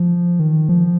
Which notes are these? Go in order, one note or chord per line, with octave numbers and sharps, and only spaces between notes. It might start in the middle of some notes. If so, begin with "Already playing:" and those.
Already playing: F3
D#3
F3